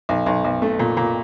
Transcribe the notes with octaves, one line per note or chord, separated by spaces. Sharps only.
B1
B1
B1
A3
A#2
A#2